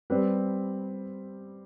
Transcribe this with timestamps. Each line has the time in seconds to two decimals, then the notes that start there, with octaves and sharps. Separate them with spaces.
0.10 G3 C4 G4 B4